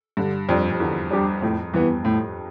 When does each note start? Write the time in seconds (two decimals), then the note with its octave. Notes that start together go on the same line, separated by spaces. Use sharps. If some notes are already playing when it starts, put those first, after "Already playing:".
0.17 G2 D3
0.49 F2 G3 D4 G4
0.71 F2
0.80 E2 D3
1.11 G3 D4 G4
1.42 F2 A2
1.74 G2 E3 B3
2.05 A2